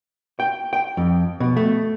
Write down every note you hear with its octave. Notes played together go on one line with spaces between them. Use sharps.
G5
G5
F2
B2
A3